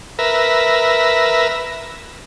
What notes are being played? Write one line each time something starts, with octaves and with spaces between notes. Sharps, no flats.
A#4 B4 E5